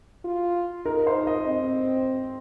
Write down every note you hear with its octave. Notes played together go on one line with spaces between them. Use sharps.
F4
D#4 A#4
C5
D#5
C4